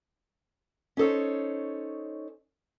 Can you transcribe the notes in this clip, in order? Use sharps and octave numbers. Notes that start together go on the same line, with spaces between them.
C#4 D#4 A4 C5 C#5